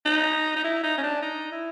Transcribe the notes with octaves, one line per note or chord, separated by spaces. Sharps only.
D#4
D#4
E4
D#4
C#4
D4
D#4
E4